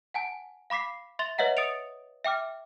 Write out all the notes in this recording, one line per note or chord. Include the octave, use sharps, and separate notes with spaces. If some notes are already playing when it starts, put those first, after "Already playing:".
F#5 G#5 A5
F5 B5 D6 B6 C7
E5 C6 A6 F7 G7
B4 C#5 D#5 E5 F#5 A#5
D#6 A6 C#7 D7 F7
E5 G5 D6 F6